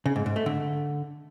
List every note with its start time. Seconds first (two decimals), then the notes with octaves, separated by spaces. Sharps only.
0.06 C#3
0.16 G#2
0.26 G#2
0.36 A3
0.46 D3